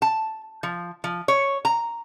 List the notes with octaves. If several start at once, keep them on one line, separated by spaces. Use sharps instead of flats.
A5
F3
F3
C#5
A#5